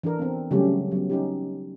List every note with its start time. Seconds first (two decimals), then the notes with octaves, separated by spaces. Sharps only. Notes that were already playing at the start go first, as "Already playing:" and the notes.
0.03 E3 D4 A4 A#4
0.19 B3 C4
0.51 C#3 F#3 G3 A3 C#4 G4
0.91 F#3 B3
1.10 C#4 D#4 G4